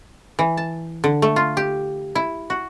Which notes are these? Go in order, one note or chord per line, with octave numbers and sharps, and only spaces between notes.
E3
A5
D3
A3
F4
G4
E4
F#4